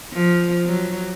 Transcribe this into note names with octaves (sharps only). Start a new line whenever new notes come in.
F3
F#3